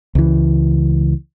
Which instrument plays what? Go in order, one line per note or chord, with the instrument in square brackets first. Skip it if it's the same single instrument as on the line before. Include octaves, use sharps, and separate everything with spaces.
[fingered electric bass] C#2 E3